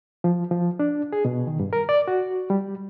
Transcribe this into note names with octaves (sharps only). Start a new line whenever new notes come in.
F3
F3
D4
G#4
B2
D#3
G2
A#4
D5
F#4
G3